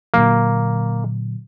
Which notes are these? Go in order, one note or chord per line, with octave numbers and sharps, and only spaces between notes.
A#2 D3 F#3 A#3